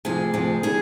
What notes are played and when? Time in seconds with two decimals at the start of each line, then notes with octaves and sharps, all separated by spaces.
0.05 D2 C3 F3 G#4
0.34 D2 C3 F3
0.63 D#3 G3 G#4